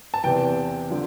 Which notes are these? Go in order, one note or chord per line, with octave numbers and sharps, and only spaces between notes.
A5
E2 C3 E3 G5
D3 F3